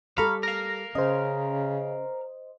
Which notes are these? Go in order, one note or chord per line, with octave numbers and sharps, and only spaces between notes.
G3 A4 F5 A#5 B5 C#6
A#4 F5 A#6
C#3 C#4 C5 D#5